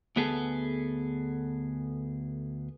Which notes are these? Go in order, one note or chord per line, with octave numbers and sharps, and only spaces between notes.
D2 B3 G#4 A4